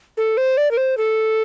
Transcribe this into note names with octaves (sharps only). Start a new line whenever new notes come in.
A4
C5
D5
A#4
C5
A4